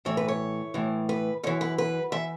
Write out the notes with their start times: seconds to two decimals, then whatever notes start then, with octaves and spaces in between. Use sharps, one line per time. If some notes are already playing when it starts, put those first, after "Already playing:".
0.05 A2 E3 C#5
0.17 B4
0.28 C#5
0.74 A2 E3
1.09 B4
1.43 F#2 E3 C#5
1.61 B4
1.78 B4
2.12 E3 E5